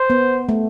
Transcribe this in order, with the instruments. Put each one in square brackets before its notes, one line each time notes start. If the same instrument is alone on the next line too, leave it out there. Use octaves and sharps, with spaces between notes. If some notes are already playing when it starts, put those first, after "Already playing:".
Already playing: [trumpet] C5
[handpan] B3
A3